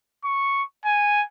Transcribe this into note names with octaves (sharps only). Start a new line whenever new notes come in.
C#6
G#5